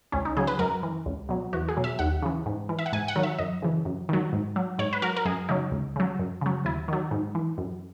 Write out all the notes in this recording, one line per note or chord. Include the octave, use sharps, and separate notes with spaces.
C#2 C#4
D#4
C#3 F#3 G#4
B4
F#2 A#4
E3
C#2
B2 F#3
E2 F#4
G#4
B2 F#3
E5
D#2 F#5
C#3 E3
G#2
E3
E5
F#5
G#2 G#5
F#5
D#3 F#3
E5
F#2 D#5
C#3 E3
F#2
D#3 F#3
G#2
F#3
G#2 C#5
B4
F#3 A#4
A#4
F#2 G#4
C#3 F#3 D#4
C#2
C#3 F#3
F#2
C#3 F#3
D#2 E4
D#3 F#3
G#2
E3
F#2